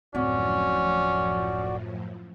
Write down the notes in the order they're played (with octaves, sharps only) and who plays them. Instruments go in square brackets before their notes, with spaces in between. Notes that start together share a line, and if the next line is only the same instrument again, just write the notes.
[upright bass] D1 C4 [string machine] F#2 A2 F3 [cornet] C#4 [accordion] F#4 D5